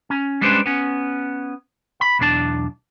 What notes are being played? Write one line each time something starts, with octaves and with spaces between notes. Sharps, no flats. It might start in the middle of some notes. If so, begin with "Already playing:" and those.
C#4
G3 G#3 C#4 D4 B4 C5
B3 C#4
B5
B1 E2 D4 A5